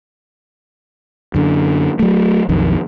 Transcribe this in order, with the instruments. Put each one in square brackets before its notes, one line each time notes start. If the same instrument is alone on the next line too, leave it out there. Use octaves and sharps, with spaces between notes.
[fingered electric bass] F#2 D3
F#3 A3
B1 F2 D#3